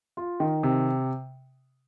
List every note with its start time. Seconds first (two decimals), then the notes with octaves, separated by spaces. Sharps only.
0.17 F4
0.40 D#3
0.63 C3